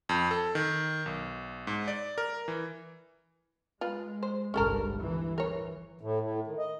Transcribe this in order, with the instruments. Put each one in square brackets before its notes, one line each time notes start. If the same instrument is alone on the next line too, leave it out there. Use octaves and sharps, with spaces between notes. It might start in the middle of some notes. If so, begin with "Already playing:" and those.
[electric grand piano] F2
A4
D#3
B1
G#2
D5
A#4
E3
[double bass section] G#3 [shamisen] F4 B4
[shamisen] C5
[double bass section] G#1 C#2 G2 [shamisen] C#4 A4 A#4
[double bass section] G1 E3
[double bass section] E3 [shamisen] A#4 C#5
[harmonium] A2
A2
D#3
D#5